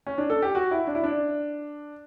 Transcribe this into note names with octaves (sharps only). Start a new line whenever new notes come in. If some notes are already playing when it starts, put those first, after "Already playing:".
C#4
D4
A4
G4
F#4
E4
D4
E4
D4